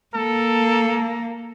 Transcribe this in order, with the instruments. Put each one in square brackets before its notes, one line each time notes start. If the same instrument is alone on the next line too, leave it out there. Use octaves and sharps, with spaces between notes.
[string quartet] A#3 [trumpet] A4